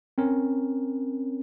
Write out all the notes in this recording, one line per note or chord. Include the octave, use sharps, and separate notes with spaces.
C4 C#4 A#4 C#5